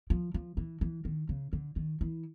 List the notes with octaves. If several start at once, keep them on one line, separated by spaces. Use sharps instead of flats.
F3
F3
E3
E3
D#3
C#3
D3
D#3
E3